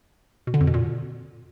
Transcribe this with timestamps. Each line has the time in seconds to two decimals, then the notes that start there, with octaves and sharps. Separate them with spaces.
0.47 B2
0.54 D3
0.61 F2
0.67 B2
0.74 A#2